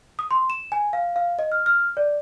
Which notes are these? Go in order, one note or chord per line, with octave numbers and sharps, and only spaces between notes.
D#6
C6
E7
G#5
F5
F5
D#5
F6
F6
D5